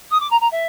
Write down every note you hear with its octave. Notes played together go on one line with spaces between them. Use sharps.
D#6
D6
A#5
A#5
E5